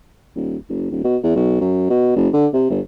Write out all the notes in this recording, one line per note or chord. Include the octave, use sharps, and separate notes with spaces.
D#1
F#1
D#1
B2
E2
B1
F#2
B2
F#1
D3
C3
G1